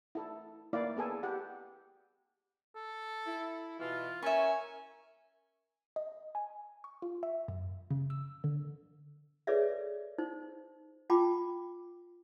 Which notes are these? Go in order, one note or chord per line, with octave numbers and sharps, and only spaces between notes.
E4 A4
A#3 E4 D5 F5
B3 G#4 A4 G#5
G4 F#5
A4
E4
B2 E3 F4
C#4 A#4 E5 G#5 C#6
D#5
G#5
C#6
F4
E5
F#2
C#3
E6
D3
G#4 A4 B4 C#5 D5 E5
D#4 C5
F4 G5 A5 B5 D6